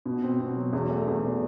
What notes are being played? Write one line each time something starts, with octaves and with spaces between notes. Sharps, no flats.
B2
C4
B2
F#3
E2
A3
E2
B2